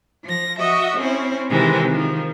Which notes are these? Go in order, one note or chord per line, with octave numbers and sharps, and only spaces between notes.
F3 A#6
F#4 D#5 E5
C4 C#4 E4 C5
C3 D#3 E3 G#3 C4
D#3 F3